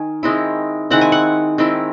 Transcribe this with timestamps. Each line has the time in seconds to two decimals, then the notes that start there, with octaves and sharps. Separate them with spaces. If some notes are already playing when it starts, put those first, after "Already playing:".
Already playing: D#3 G#5
0.23 D#3 G#3 C4 E4
0.90 D#3 G#3 C4 E4 F#5
1.01 G#5
1.12 F#5
1.58 D#3 G#3 C4 E4